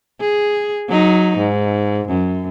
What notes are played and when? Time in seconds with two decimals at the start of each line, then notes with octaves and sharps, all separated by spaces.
0.20 G#4
0.88 F#3 D#4
1.37 G#2
2.08 F#2